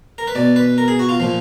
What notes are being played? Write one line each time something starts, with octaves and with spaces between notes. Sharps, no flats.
A#4
B4
B2 D5
B4
A#4
G#4
F#4
F4
A#2 F3